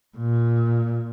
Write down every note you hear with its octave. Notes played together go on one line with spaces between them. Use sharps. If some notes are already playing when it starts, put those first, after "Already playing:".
A#2